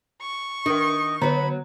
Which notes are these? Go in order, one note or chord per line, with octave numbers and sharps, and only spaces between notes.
C#6
D#3 D4 A#4 D#5
D3 F#3 B3 A#5 B5